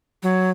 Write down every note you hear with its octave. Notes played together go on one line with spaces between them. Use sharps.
F#3